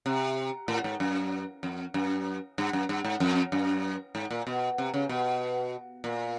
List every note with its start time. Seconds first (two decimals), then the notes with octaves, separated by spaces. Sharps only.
0.06 C3
0.68 A2
0.84 G#2
1.00 F#2
1.63 F2
1.94 F#2
2.58 G2
2.73 F#2
2.89 G2
3.05 G#2
3.20 F2
3.52 F#2
4.15 G#2
4.31 A#2
4.47 B2
4.78 C3
4.94 C#3
5.09 B2
6.04 A#2